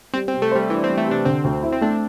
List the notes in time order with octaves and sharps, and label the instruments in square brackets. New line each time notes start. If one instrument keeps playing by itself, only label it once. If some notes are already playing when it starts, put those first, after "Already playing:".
[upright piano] G3 [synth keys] C4
[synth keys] C4
[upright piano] C3
[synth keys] A3
[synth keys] G3 [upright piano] C5
[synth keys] E3 [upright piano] D4
[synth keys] C4
[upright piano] G3
[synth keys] A3
[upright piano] C3 [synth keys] D4
[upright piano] D3 [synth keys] C4
[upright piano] D2
E4
[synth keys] C4
[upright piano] A3 [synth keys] D4